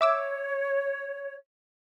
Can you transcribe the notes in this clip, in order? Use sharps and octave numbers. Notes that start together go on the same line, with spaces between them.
C#5 E5 D6 E6